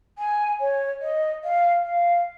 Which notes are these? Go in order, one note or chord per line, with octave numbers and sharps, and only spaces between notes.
G#5
C#5
D#5
F5
F5